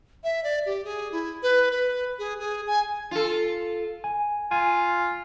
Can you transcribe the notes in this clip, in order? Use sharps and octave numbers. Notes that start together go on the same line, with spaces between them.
E5
D5
G4
G#4
E4
B4
B4
G#4
G#4
G#5
F4 A4
G#5
F4 G#5